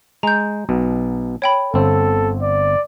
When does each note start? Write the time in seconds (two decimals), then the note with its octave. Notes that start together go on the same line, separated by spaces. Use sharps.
0.23 G#3 A#5 G6
0.69 B1 B2
1.42 C#5 G5 B5
1.74 G1 C4 A4
2.42 D5